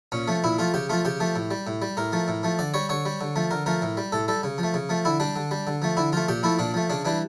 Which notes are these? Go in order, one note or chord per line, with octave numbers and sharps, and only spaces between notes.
A#2 C#4
F3 A3
A#2 E4
F3 A3 F4
C#3 G4
F3 A3 F4
C#3 G4
F3 A3
A2
G3
A2
G3
A2 A#4
F3 A3
A2
F3 A3
D3 D5
G3 C#5
D3 C#5
G3
D3
F3 A3
D3 A#4
F3 A3 A#4
A2
G3
A2 A4
G3 A4
C#3
F3
A3
C#3
F3 A3
D3 E4
G3 D4
D3
G3
D3
F3 A3
D3 E4
F3 A3 F4
A#2 G4
F3 A3 E4
A#2 D4
F3 A3
C#3 D4
E3 G3 D4